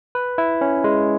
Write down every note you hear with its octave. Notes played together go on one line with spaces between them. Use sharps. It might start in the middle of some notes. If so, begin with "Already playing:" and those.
B4
E4
C#4
G#3